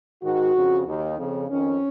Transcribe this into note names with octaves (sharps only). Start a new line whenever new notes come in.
G#2 D#3 F#4
F2 C#3
D#2 D#3
F2 C#3
F2 D#3 C#4